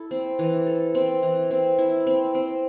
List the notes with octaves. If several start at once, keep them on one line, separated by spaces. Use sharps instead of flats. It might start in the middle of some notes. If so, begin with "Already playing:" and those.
Already playing: E4 A4
C4
E3
A4
C4
E3
C4
E4
C4
C4